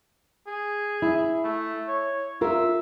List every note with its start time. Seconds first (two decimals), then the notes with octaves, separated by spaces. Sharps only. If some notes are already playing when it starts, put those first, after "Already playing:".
0.47 G#4
1.02 E4
1.44 A3
1.88 C#5
2.41 F4 A#4 E5